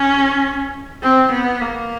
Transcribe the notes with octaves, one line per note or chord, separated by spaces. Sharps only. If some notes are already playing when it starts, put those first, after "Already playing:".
Already playing: C#4
C4
B3
A#3